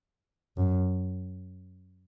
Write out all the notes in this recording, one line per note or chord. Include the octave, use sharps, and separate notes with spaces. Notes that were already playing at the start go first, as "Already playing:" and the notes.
F#2